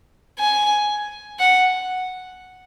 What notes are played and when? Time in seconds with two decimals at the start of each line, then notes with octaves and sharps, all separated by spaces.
0.39 G#5
1.40 F#5